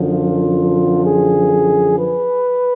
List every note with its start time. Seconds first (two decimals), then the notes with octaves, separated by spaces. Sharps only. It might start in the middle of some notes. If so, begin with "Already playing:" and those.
Already playing: F#2 D3 F3
0.12 F4
1.05 G#4
1.98 B4